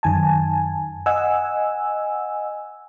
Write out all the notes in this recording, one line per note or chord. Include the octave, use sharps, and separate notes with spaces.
F#2 D#3 G#5 A5
D#5 F#5 G#5 E6